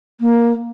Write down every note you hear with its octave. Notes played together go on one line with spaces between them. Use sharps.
A#3